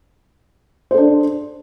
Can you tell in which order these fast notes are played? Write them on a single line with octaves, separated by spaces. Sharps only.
C5 A4 D4